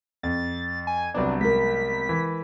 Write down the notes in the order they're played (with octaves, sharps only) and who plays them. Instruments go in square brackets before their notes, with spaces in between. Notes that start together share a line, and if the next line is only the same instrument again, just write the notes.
[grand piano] F2 [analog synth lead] A6
[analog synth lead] G#5
[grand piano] C2 F#3 B3 [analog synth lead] D4
[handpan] G#3 A#4 [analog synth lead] B6
[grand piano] E3